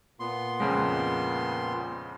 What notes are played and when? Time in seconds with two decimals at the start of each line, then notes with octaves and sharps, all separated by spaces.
0.20 A#2 B3 C6
0.60 F2 C#3 G#3